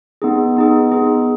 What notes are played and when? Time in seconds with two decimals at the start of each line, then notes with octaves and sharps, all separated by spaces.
0.22 B3 D#4 G#4
0.57 B3 D#4 G#4
0.92 B3 D#4 G#4